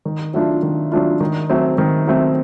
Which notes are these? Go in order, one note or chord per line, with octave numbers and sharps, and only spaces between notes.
D#3
F#3 A3 D4 F4
D#3
F#3 A3 D4 F4
D#3
F#3 A3 C4
D#3
F#3 A3 C4